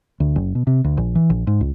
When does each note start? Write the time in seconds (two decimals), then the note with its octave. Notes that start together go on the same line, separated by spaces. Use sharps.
0.20 D2
0.36 F#1
0.55 B2
0.67 C3
0.84 D2
0.97 A#1
1.15 E3
1.30 A#1
1.47 G#2
1.61 C#2